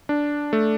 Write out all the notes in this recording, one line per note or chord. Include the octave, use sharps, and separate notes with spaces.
D4
A3